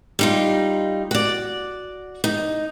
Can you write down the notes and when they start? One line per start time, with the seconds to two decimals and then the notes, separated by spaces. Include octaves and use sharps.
0.19 G3 D#4 F4
1.11 F#4 D5
2.24 D#4